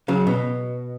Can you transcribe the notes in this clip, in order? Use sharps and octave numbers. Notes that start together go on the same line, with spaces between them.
C#3 F#3
B2